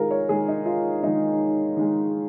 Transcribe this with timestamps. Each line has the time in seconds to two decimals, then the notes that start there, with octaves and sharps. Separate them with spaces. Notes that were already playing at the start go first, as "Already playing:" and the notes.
Already playing: D#3 G#3 F4 G#4 A#4
0.11 C#5
0.29 D#3 G#3 G#4
0.48 D#4
0.66 F4
1.03 D#3 G#3 D#4
1.77 D#3 G#3